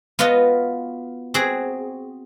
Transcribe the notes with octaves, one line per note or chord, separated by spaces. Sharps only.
B3 F4 F#4 B4 D#5
C4 F#4 G#4